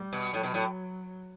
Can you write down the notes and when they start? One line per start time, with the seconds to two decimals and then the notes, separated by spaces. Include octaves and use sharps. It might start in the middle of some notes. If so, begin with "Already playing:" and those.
Already playing: G3
0.13 B2
0.33 A2 F#3
0.43 B2
0.54 A2